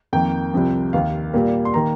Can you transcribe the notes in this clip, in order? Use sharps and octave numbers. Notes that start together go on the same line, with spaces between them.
F2 D#3 A#3 G5
C2 C3 F3
D#2 D#3 A#3 F5
A#2 G3 A#3
C6
D#3 A#3 A#5